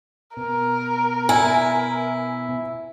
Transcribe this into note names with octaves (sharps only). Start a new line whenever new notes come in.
B2 B3 A#4
E4 G#5